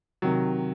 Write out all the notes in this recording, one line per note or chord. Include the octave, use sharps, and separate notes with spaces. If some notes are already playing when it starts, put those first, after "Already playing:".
C3 D#3 F#3